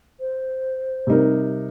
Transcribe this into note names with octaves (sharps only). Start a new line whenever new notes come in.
C5
C3 G3 D#4 A#4